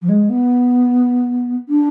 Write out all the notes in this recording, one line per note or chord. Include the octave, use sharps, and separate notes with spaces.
F3
G#3
B3
D4